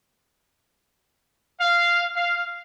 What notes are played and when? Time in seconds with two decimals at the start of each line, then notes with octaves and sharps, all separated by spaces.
1.60 F5
2.16 F5